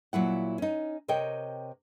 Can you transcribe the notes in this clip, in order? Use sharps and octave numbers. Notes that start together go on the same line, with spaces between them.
A#2 F#3 E4 F#5
C#4 D#4
C3 A#4 C#5 D#5 G5